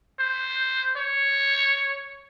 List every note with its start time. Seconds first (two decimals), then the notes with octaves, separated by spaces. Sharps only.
0.19 C5
0.97 C#5